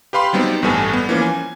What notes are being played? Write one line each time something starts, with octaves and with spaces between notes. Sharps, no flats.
G4 B4 F5 B5 C6
F#3 G3 B3 C4 D#4
A1 G2 G3 B3 A4 G#5
G3 B3
E3 F3 A#3 C#4
G#5